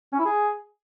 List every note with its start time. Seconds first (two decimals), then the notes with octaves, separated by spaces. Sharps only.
0.13 C#4
0.19 E4
0.25 G#4